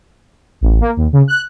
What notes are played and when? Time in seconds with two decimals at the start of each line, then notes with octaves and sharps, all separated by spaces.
0.61 A1
0.81 A#3
0.96 D#2
1.13 C#3
1.28 F#6